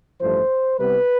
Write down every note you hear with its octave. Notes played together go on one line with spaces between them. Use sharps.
A1 G2 F3 A3 C5
C2 C3 G3 B3 B4